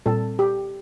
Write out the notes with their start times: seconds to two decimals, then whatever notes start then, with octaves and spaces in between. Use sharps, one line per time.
0.06 A#2 G3 C4 A4
0.39 G4